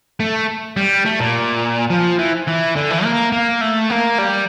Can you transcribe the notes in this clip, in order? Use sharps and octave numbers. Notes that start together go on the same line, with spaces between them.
A3
G3
A3
A#2
F3
E3
E3
D3
E3
A#3
A#3
A3
A#3
G3